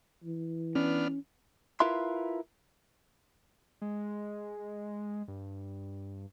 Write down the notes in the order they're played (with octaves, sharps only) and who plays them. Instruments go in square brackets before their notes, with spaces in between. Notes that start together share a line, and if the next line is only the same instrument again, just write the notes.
[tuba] E3
[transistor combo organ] B3 D4 F6 [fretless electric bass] C#4
[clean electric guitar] E4 F4 A#4 B4 E5 C6
[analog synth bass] G#3
G2